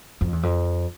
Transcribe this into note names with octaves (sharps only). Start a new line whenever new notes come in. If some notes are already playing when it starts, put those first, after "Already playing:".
F2
E2
F2